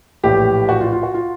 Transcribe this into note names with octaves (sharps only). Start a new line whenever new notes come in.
A#1 A2 E3 G4
F#4
F4
F4
F#4
F4